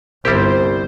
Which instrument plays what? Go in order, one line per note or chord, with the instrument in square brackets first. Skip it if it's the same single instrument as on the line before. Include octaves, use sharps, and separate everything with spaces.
[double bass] G1 G2 [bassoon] C2 [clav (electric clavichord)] G3 E4 G4 [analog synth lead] C5